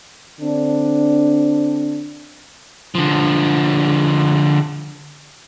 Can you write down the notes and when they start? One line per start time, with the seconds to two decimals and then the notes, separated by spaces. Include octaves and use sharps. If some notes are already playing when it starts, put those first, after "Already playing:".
0.40 D3 C4 D4
2.95 D3 F3